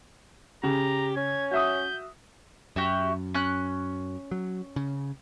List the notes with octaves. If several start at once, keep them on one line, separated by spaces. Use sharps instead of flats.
C#3 G4 A#5
C#4 G#6
F#4 E5 D#6 G6
F#2 F#4 G4 E5
C#4 F#6
F#3
C#3